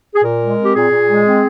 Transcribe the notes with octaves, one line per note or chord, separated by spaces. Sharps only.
G#4
A#2 A#4
G#3
C4
G4
A#2 G#4
A#2
G#3
C4